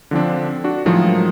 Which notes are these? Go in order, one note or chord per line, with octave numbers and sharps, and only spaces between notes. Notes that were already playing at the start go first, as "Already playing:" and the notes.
D3 F3 C4 D4
D4 F#4
A2 D#3 F3 F#3 G#3